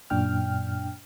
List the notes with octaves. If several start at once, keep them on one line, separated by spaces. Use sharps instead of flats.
F#2 A#2 D4 G5 F6